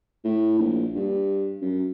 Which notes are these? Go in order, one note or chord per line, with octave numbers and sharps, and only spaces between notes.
A2
A#1
G2
F#2